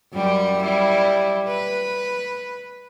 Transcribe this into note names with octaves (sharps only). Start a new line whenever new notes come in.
F#2 G3 G4
G3 E4
B4